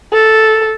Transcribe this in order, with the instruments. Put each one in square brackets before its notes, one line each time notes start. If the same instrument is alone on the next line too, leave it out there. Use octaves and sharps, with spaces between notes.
[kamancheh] A4